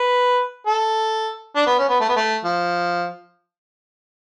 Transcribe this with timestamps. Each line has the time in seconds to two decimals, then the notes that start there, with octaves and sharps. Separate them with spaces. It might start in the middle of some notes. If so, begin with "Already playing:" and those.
Already playing: B4
0.67 A4
1.56 D4
1.67 B3
1.79 C#4
1.89 B3
2.01 A3
2.09 B3
2.16 A3
2.45 F3